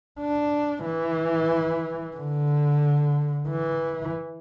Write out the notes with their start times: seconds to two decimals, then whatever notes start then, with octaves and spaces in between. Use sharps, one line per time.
0.21 D4
0.86 E3
2.17 D3
3.48 E3